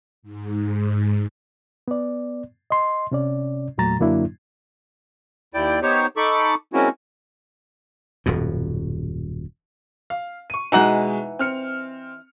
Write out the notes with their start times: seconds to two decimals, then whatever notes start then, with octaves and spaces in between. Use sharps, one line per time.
0.22 G#2
1.88 B3 D5
2.70 D#5 C6
3.11 C3 C#4 D5
3.78 E2 A#2 F#3 A3 A#5 A6
3.99 F#2 D3 F#3 A#3 D4 E4
5.54 D#2 E4 D5 G5
5.82 B3 D#4 G4 C5 C#5
6.17 D#4 A4 B5 C#6 D6
6.73 G#3 A#3 C4 C#4 E4 F#4
8.26 D#1 F#2 B2
10.10 F5
10.50 C#6 D#7
10.72 B2 E3 G#3 D#4 F#5
11.39 C4 F6 C#7